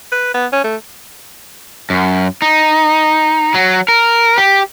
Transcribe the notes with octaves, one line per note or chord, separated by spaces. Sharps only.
B4
B3
C#4
A3
F#2
D#4
F#3
A#4
G4